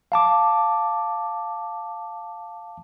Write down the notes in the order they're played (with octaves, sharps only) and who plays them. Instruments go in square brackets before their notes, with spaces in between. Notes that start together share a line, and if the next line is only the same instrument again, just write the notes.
[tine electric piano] F5 A5 D6